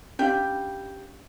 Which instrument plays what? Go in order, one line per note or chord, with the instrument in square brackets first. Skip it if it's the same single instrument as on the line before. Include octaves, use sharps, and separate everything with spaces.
[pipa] G3 G4 G5 [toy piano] C#4 D4 F5